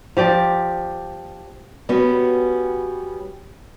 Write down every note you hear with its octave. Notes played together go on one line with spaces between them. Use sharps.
F3 G4 D5
G3 B3 C#4 F#4